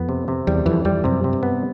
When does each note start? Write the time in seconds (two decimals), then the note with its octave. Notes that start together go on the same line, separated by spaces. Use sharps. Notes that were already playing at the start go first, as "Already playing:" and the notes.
Already playing: F2 B3
0.09 C3
0.28 C3
0.47 E2 G3
0.66 F2 E3
0.85 F2 G3
1.04 F#2 C3
1.24 C3
1.33 G2
1.43 B3